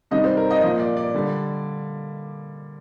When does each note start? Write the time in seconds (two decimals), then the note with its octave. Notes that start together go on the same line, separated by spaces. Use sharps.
0.11 C3 D#3 G3 D#5
0.24 C5
0.37 A#4
0.50 D#5
0.62 F3 D#5
0.66 A#2
0.79 D5
0.97 D5
1.14 D3 G3